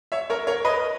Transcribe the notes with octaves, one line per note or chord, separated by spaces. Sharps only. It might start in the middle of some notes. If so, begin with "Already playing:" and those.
C#5 E5
A#4 C#5
A#4 C#5
B4 D#5